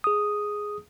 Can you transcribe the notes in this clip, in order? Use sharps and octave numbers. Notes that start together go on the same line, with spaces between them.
G#4 D#6